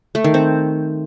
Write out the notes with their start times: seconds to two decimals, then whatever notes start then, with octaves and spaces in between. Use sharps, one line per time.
0.15 A3
0.24 D#3
0.34 C4